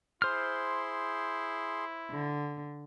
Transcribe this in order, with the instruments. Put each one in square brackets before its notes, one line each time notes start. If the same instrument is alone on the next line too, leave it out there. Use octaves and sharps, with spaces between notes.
[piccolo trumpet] E4 [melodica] G#4 C6 [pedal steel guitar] C5 F6
[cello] D3